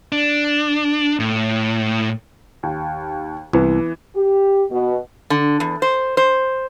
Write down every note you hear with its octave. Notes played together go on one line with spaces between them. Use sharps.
D4
A2
D#2
C2 E3 B3
G4
B2
D3
E2
C5
C5